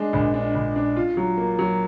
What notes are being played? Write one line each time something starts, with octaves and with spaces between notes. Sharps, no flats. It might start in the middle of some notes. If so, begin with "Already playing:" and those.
Already playing: G#3 D4
A#1
D4
A#1
D4
F4
F#3
A#3
F#3